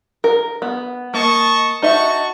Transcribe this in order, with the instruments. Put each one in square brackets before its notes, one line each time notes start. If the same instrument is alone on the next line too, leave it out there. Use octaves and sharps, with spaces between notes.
[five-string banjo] A#4
B3
[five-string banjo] A#3 [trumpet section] D#5 A5 C#6
[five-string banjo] D#4 D#5 E5 [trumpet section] F#4 A5 C#6